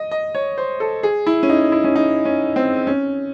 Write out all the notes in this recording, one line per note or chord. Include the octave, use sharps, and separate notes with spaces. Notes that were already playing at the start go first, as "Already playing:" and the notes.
Already playing: D#5
D#5
C#5
C5
A4
G#4
E4
C#4
D#4
E4
C#4
D#4
C#4
C4
C#4